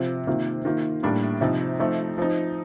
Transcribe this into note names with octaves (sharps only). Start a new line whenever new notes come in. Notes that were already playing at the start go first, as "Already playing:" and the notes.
Already playing: C3 F3 C4 F4
C3 D#3 A#3 F4
D#3 A#3 F4
A2 G3 A#3 D4
C3 F3 C4 D#4
F3 A3 C4 D#4
F3 C4 D#4